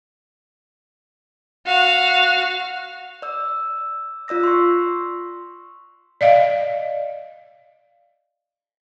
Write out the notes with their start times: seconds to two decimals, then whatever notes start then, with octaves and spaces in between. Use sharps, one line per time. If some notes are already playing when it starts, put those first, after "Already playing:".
1.66 F#4 F5
3.22 D5 E6
4.28 F4 D5 E6 A#6
4.43 C6 C#6
6.21 D5 D#5 F5